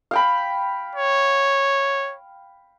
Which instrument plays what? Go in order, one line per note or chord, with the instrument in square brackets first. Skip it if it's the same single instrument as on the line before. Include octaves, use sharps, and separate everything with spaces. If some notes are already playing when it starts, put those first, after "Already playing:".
[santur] F5 G5 B5
[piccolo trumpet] C#5